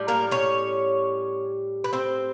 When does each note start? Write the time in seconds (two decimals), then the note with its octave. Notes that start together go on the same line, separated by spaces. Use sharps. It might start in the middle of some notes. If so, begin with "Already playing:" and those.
Already playing: A2 G3
0.08 A#3 A#4
0.31 C#4 C#5
1.84 B4
1.93 C4 C5